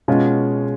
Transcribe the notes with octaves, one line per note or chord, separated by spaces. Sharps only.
B2 G#3 C#4 F4